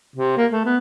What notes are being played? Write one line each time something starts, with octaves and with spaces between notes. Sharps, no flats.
C3
A#3
A3
B3